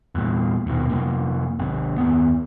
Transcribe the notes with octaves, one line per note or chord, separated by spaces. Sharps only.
E2 A#2
D#1 D#2 B2 D#3
F2 C3 A#3
G#1 C3
D#2 B3